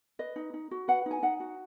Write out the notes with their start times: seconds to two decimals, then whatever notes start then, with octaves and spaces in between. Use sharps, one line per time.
0.19 B4 D#5
0.36 D#4
0.54 D#4
0.71 F#4
0.88 B4 F#5
1.06 D#4 G#5
1.23 D#4 F#5
1.40 F#4